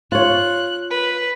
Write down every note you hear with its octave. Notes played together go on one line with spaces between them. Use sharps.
F4 C#5 F#6
B4